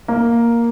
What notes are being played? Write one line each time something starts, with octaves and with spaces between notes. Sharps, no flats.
A#3